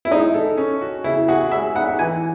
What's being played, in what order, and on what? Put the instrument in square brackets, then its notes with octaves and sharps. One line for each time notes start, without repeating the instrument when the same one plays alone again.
[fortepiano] E4
[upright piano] G#3 [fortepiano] D#4
[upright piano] A4
C#4
F#4
[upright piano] C#3 [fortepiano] E4
[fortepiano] F#4 [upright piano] G#4
[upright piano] G#3 [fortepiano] E5
[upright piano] D#4 [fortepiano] F#5
[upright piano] E3 [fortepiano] G#5